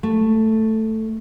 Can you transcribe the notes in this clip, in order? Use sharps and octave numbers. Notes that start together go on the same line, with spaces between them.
A3